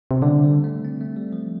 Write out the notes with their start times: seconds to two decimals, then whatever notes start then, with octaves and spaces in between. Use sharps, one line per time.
0.11 C3
0.22 D3 G3
0.44 G3
0.64 A3
0.85 C4
1.01 A3
1.17 G3
1.33 F3